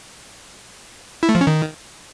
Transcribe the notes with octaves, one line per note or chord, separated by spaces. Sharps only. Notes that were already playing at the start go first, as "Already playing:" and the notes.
E4
A3
F3
C#4
D#3